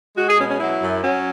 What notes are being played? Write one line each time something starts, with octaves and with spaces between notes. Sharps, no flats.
G#3 F#4
G#4
B2 C#4
C#4
F#3 E4
F#2
F#3 C#4